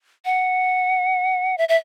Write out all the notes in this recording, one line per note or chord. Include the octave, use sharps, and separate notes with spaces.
F#5
E5
E5